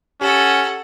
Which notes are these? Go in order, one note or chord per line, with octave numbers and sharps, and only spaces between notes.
C#4 G4 A4 F#5